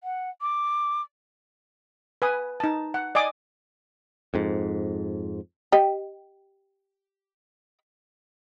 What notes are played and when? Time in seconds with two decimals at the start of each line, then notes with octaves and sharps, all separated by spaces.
0.03 F#5
0.41 D6
2.22 B4 G#5 D#6
2.60 D#4 A5
2.94 F#5
3.15 D5 D#5 G#5 D6 D#6
4.34 F2 G#2
5.72 G4 D#5